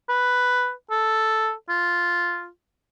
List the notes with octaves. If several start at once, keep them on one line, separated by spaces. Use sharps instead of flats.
B4
A4
F4